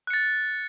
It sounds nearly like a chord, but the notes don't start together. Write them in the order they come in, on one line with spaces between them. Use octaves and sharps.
F#6 C#7 A6